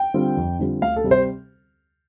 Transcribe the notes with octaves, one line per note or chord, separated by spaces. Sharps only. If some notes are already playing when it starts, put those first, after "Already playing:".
Already playing: G5
D3 G3 C4 F4
F2
D3 G3 C4 F4
D2 F5
A4
C3 G3 C4
C5